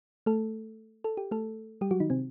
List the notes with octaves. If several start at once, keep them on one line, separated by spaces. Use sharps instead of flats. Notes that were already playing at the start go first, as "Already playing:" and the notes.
A3 A4
A4
G4
A3 A4
G3 G4
F#3 F#4
D#3 D#4
C3 C4